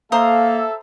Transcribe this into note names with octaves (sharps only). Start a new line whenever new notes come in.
A#3 A4 C5 E5 F5 A#5 D#6